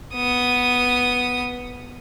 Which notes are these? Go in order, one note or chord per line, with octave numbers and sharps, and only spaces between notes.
B3 D#6